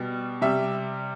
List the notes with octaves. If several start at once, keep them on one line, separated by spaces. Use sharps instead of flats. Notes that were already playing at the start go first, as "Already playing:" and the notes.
Already playing: B2 G3
C3 G3 E5